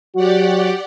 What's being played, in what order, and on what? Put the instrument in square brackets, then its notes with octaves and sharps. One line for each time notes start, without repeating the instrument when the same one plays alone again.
[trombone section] F#3 F#4 [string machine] G4 D5 F#5